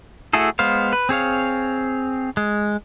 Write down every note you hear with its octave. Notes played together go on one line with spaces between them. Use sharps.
A3 E4 F#4 G#4 A4
G#3 B3 C5 F5
B4
C4 G#4 C#5 F5
G#3